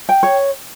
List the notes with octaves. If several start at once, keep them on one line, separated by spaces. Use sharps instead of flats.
G5
C#5